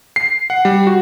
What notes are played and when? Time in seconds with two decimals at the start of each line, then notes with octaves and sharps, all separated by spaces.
0.16 C7
0.50 F#5
0.65 G3
0.87 F#4